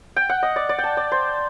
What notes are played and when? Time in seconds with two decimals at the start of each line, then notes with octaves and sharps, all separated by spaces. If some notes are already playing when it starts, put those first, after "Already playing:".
0.16 G5
0.30 F#5
0.43 D#5
0.56 D5
0.69 D5
0.78 G5
0.84 A5
0.97 D5
1.12 C5